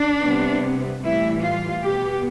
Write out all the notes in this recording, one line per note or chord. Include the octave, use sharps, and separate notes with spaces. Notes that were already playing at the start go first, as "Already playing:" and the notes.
Already playing: D4
C3 G3 B3
A2 E3 G3 E4
F4
B2 B3 G4